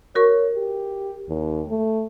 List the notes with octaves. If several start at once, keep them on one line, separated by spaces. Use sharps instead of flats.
F#4 A#4 C#5 C#6
G4
D#2
A3